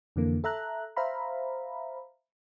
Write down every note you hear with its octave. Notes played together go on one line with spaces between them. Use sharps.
F2 D3 E3 A#3
A4 E5 A#5 F#6
C5 E5 F5 A#5 B5